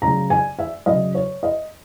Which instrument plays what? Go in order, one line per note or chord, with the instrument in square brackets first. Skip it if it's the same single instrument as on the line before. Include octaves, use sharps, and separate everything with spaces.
[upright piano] C#3 F#3 A#5
G#5
E5
C#3 F#3 D#5
C#5
D#5